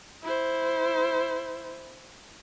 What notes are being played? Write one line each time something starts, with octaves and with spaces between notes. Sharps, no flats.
E4 C5